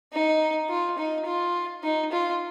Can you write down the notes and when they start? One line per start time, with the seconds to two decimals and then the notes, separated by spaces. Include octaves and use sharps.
0.13 D#4
0.69 F4
0.98 D#4
1.26 F4
1.84 D#4
2.12 F4